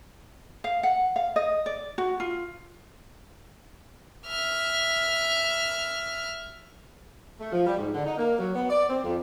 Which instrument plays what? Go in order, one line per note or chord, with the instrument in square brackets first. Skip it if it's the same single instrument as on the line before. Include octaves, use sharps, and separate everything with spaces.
[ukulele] F5
F#5
F5
D#5
D5
F#4
F4
[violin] E5 F6
[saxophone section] A3
F3
G3
G#2
D3
D#4
A#3
F#3
B3
D5
C4
F2